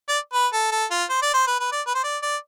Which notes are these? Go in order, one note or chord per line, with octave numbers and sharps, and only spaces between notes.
D5
B4
A4
A4
F4
C5
D5
C5
B4
B4
D5
B4
C5
D5
D5